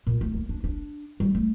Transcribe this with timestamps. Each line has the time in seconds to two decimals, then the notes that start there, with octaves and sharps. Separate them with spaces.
0.07 A#2
0.21 A3
0.35 A#3
0.49 D4
0.64 D4
1.20 G3
1.35 A3